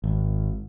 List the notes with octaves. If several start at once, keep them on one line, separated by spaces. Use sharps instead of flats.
G#1